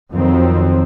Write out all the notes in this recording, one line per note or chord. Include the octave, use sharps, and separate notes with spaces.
F2 D#3 F#3 C4